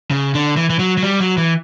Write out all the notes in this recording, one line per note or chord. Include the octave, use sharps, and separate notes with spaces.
C#3
D3
E3
E3
F#3
F#3
G3
F#3
E3